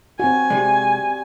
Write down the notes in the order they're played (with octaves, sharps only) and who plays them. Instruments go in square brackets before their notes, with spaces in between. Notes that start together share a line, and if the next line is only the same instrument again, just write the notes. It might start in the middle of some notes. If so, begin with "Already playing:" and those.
[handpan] C4 F#4 [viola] G#5
[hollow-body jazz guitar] C3 G#3 [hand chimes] G4 D5